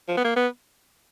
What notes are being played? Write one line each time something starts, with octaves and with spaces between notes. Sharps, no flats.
F3
B3
A#3
B3